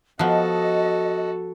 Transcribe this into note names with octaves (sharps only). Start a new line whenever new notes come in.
F3 B3 F#4 A4 D#5